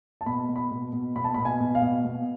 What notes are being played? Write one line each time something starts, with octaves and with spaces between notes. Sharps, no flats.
A5
B2 B5
B2
B5
B2
B2
B2 B5
A5
B2 B5
G#5
B2
F5
B2
B2